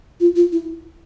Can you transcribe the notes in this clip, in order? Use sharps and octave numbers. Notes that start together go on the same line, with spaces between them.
F4
F4
E4